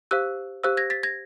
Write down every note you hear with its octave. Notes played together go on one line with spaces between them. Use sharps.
G4 C5 F5 E6 F#6
G4 C5 F5 E6 F#6
G#6 A#6
A6 B6
G#6 A#6